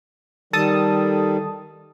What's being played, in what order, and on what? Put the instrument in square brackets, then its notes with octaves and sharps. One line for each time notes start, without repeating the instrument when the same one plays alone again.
[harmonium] D#3 G3 [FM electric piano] A4 A5 D#6